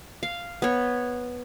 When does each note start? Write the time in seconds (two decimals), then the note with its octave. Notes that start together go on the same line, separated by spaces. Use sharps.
0.23 F5
0.62 B3 C#5